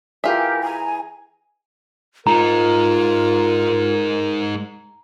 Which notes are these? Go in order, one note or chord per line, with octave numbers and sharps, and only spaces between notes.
E3 F4 G4 G#4 A#4 E5
G#5 A#5
G#3 D#4 F4 A#4 A#5